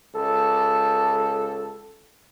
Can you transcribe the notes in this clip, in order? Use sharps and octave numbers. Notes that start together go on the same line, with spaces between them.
C#2 A4